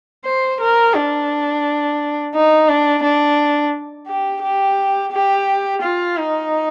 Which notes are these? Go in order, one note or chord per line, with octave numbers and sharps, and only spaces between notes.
C5
A#4
D4
D#4
D4
D4
G4
G4
G4
F4
D#4